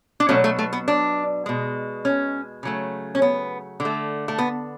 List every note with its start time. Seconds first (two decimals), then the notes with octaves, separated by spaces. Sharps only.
0.20 D4
0.29 B2 F#3 A3 C#4
0.44 A3
0.59 A3
0.73 B3
0.88 D4
1.46 B2 G#3
2.05 C#4
2.63 C#3 F#3 A3
3.15 C#4
3.22 B3
3.80 D3
3.85 A3
4.28 A3
4.38 B3